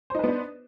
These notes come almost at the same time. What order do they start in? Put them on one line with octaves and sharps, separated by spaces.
C5 D#4 B4 B3 D4